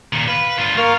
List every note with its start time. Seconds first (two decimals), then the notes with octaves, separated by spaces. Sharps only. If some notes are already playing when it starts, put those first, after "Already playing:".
0.13 A#2 D#3
0.28 B4 F5
0.58 G2 F4
0.77 A#3 F4 A#4 F5 C#6